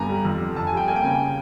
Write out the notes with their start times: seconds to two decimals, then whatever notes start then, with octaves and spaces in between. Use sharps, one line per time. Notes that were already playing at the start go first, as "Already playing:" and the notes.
Already playing: G2 D3 B3 G#5 A#5
0.09 G3
0.25 F2
0.40 D3
0.56 F2 A5
0.67 G#5
0.72 G3 G5
0.88 A#3 G#5
0.96 G5
1.04 C#3 G#5